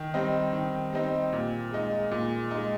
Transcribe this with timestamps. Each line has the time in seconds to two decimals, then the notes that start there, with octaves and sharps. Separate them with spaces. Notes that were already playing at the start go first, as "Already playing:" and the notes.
Already playing: D#3
0.14 G3 C4 D#4
0.53 D#3
0.93 G3 C4 D#4
1.33 A#2
1.71 G#3 D#4
2.11 A#2
2.51 G#3 D#4